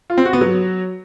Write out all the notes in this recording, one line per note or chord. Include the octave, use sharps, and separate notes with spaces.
F4
C4
F#4
B3
F#3